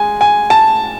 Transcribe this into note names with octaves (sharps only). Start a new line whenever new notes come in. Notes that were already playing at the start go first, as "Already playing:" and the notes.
Already playing: G#3 G#5
G#5
A5